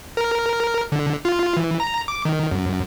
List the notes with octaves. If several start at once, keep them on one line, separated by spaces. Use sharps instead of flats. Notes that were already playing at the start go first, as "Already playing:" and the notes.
A#4
D3
F4
E3
A#5
D6
D#3
F#2